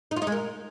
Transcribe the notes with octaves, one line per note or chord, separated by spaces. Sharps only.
D#4
F4
D#4
G#3
A#4